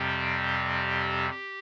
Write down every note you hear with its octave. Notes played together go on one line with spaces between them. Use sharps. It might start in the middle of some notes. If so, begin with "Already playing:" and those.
Already playing: F2 C3 G3 C4 G4
G4